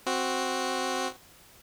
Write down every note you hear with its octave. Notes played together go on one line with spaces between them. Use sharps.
C4 F#4